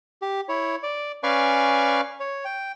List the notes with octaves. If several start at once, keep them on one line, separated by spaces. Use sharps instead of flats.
G4
E4 C#5
D5
C#4 B4 D5 F5 G#5 C#6
C#5
G5